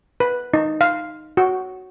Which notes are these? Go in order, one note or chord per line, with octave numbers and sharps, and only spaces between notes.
B4
D#4
F5
F#4